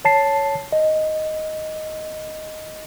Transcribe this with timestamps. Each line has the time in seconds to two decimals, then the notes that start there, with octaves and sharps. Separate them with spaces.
0.05 C#5 A5 C7
0.72 D#5